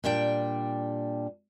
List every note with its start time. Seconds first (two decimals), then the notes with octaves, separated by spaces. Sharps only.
0.04 A#2 G3 D4 G5